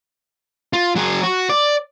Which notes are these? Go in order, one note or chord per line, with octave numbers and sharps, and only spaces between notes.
F4
F#3 G#4
F#4
D5